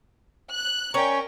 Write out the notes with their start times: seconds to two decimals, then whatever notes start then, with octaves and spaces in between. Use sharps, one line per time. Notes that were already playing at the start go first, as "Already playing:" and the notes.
0.52 F#6
0.94 C#4 A#4 G5